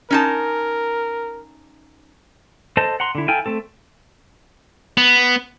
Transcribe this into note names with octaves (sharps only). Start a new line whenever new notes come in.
C#4 D#4 A#4 A5
A4 C5 D#5 A5
F#5 A#5 C6
D3 E4
E4 A4 F5 G5 G#5
A3 C4 A4
B3